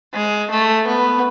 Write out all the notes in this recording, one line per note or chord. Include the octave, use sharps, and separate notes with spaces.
G#3
A3
B3